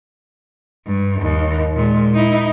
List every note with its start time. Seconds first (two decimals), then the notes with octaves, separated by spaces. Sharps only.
0.87 G2
1.22 D#2
1.76 A#2 G#3
2.14 D#4 E4